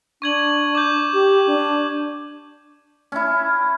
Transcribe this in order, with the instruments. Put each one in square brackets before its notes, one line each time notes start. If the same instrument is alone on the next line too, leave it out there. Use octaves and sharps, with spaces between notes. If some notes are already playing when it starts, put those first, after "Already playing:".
[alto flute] D4 [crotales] C#6 G#6 F#7
[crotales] D6 G6
[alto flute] G4
D4
[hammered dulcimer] C#4 E4